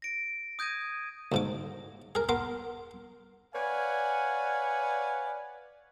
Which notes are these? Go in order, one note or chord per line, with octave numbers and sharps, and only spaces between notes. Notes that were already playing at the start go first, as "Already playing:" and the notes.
A#6 D7
D#6 G6 G#6 A#6 D#7
D2 G#2 D6
G#4 A#4
B3 A#4 C6 D6
B4 C#5 D5 F5 F#5 G#5